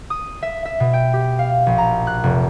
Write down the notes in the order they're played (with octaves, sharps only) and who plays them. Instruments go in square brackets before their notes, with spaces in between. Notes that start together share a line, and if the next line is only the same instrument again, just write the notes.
[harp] D#6
E5
E5
B2
G5
G4
F5
A#1
A#5
F#6
F1